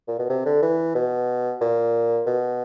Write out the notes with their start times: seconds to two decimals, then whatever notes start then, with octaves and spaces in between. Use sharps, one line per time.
0.08 A#2
0.19 B2
0.30 C3
0.46 D3
0.62 E3
0.95 B2
1.61 A#2
2.26 B2